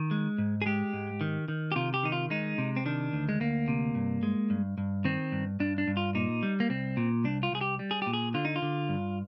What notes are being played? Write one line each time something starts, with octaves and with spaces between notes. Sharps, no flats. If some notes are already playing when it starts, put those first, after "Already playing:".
Already playing: D#3
G#3
G#2
G#4
G#3 G4
G#2
D#3
D#3
G4
C3 F4
G4
D#3 D#4
F4
G#3 D#4
C3
C4
D#3 D4
D2
G#3
D2 A#3
C3
G2
G#3
G2
G2
D#3 C4
G2
G2 D4
D4
G2
F4
A#2 D#4
G3
A#3
C2 C4
A#2
C2 D4
F4
C2 G#4
G4
G3
G#4
A#2 G4
G#4
D3 F4
D#4
F4
D3
G2